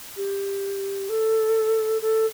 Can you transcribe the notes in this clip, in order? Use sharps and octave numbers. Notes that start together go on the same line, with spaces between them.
G4
A4
A4